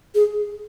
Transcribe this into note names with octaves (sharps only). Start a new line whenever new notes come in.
G#4